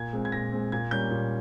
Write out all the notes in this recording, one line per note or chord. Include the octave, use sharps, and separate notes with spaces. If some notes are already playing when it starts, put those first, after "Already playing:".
Already playing: A#2 G#6
G#3 C4
G#6
A#2 A#6
G#3 C4
A#2 G#6
G3 A#3 C#4 G6
A#2